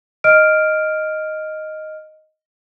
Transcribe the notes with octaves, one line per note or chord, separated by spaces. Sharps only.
D#5 F6 D7